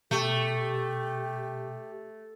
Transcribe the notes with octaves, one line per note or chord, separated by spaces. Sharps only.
B2 A3 G4